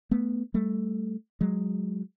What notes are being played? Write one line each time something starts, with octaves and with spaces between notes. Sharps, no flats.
A3 B3
G3 A3
F#3 G#3